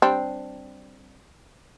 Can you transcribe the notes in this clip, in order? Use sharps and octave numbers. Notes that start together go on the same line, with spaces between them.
G3 C4 D4